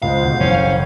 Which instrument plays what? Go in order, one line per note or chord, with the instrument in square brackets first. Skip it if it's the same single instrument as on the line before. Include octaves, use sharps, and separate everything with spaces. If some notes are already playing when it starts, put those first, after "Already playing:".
[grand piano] C#2 G#3 [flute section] C5 [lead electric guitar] F5
[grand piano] D2 B2
[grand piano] F#1 E2 [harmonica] C#4